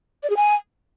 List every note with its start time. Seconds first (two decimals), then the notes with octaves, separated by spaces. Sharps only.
0.23 D5
0.30 G#4
0.36 G#5